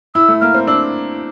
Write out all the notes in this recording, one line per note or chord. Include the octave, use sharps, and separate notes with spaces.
E4 E6
A3
A#3 F6
C4
D4 E6